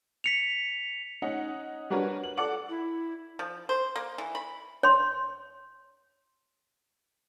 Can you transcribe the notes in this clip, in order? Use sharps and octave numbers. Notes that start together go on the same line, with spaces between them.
B6 C#7 F7
C#4 D#4 F#5
G3 D4 F#4 A#4 B4 C#5
F#7
A4 D5 F#5 D6 F#7
E4
F3
C5
A#3
E3
B5
C#5 C6